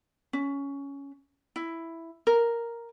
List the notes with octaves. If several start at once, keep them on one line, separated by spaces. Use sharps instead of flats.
C#4
E4
A#4